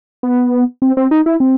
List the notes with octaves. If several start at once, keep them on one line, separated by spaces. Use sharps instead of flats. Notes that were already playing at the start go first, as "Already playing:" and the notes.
B3
C4
C4
D#4
E4
C4